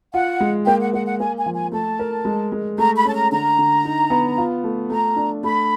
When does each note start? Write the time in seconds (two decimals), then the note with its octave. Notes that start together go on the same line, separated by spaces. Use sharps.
0.13 F4 F#5
0.40 G#3
0.66 A#3 G5
0.79 F#5
0.94 A#3 F#5
1.06 F#5
1.19 A#3 G#5
1.38 G#5
1.46 F3
1.54 G#5
1.72 A3 A5
1.99 A#4
2.25 G#3
2.52 G#3
2.78 A3 A#5
2.96 B5
3.05 C#4 A5
3.14 A#5
3.32 D3 A#5
3.58 D3
3.85 D#4
4.10 B3
4.38 F4
4.64 A3
4.90 A3 A#5
5.16 D4
5.43 A3 B5